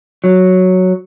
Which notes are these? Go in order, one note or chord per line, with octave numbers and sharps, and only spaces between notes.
F#3